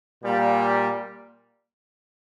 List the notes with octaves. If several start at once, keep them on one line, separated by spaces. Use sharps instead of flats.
A#2 G3 A#3